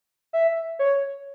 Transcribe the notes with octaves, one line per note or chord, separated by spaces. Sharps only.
E5
C#5